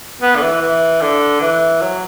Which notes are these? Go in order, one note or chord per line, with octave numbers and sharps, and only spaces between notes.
B3
D3
E3
E3
D3
E3
F#3